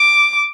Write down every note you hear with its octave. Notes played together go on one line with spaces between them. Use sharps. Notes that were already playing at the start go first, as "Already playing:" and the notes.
Already playing: D6